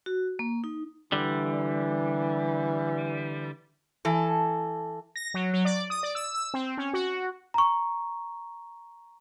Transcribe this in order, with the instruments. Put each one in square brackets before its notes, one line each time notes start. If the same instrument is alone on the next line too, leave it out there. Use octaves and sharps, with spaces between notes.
[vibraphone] F#4
A#3
D#4
[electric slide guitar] D3 G3 [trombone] E3
[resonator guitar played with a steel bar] E3 A4
[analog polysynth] A#6
F#3
F#3
D5
D#6
D5
E6
E6
C4
C#4
F#4
[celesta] A#5 C#6